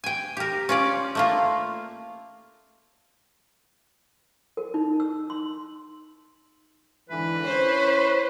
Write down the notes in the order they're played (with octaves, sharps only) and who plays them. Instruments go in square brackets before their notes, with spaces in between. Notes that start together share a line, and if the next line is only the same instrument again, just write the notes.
[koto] G5 G#5
G4 A#4
C#4 F4 D5
A3 A#3 F4
[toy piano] A#4
D#4
E6
C6
[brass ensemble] G#2 D3 E3 [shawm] B4
[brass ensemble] C#4 E4 C#5 [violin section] C5